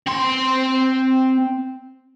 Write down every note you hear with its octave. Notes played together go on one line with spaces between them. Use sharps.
C4 C6